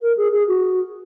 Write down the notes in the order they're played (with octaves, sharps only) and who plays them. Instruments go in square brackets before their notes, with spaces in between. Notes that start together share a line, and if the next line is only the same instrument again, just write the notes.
[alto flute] A#4
G#4
G#4
F#4